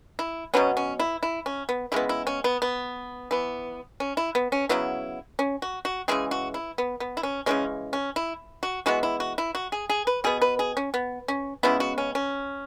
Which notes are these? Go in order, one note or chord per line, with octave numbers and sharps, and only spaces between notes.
E4
B2 F#3 B3 C#4
C#4
E4
E4
C#4
B3
C#3 G#3 B3 E4
E4
C#4
B3
B3
E3 B3
C#4
E4
B3
C#4
C#3 F#3 B3 E4
C#4
F#4
F#4
C#3 E3 G#3 G#4
F#4
E4
B3
B3
E4
C#4
C#3 E3 G#3 C#4
C#4
E4
F#4
E3 G#3 B3 F#4
E4
F#4
E4
F#4
G#4
G#4
B4
B2 B3 G#4
B4
G#4
C#4
B3
C#4
C#3 G#3 B3 E4
F#4
C#4
C#4